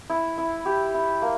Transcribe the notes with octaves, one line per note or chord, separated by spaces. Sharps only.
E4
E4
G4
E4
A#3